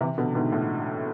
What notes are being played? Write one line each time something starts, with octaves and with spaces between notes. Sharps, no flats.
C3 E3
B2 D3
G#2 B2
A2